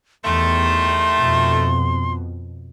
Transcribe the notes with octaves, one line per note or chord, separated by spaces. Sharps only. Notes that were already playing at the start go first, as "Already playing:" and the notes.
E2 D#3 G3 A3 C6
F2 B2